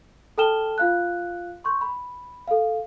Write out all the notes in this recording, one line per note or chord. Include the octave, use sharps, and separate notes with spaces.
A4 G5 A5 F6 E7 G7
F4 F5 F#6
C6 C#6 G6
B5
A4 F5